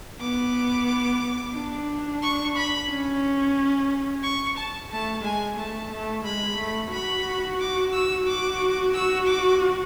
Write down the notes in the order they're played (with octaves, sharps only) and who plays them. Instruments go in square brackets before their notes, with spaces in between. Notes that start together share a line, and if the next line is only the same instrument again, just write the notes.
[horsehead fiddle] B3 [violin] D6
[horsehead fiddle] D4
[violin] C#6
B5
[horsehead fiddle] C#4
[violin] C#6
A5
[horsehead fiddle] A3 [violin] A5
[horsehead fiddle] G#3 [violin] G#5
[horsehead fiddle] A3 [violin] A5
[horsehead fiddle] A3
[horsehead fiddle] G#3 [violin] B5
[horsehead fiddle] A3
[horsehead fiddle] F#4 [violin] B5
[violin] D6
E6
[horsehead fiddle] F#4 [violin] D6
[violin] E6
D6